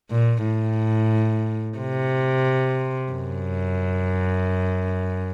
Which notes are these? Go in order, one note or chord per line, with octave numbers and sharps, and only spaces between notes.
A#2
A2
C3
F#2